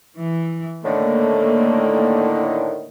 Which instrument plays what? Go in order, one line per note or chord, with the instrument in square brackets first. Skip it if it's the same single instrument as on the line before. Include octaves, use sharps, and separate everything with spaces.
[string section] E3
[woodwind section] A2 D3 D#3 [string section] A3 A#3